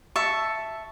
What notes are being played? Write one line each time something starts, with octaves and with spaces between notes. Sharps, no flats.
E5 A5 C#6